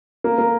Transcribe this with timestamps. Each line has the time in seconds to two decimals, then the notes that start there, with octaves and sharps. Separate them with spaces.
0.24 A#3
0.38 A#3